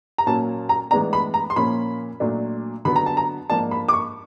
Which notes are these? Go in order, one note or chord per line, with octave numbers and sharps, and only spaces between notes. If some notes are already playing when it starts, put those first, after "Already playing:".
A#5
A#2 F#3 A#3 C#4 A5
A#5
A2 E3 G#3 B3 D4 A#5
B5
A#5
C6
A#2 F3 A#3 C#4 B5
A#2 F#3 A3 D4
D3 F#3 B3 B5
A#5
A5
A#5
G#2 F3 A#3 D4 A5
B5
D6
C#6